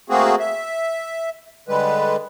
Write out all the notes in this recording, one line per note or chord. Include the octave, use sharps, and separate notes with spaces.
A3 A#3 C4 F#4 G#4
E5
D3 G3 G#3 B4